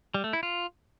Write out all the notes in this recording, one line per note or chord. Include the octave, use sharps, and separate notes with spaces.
G3
A3
E4
F4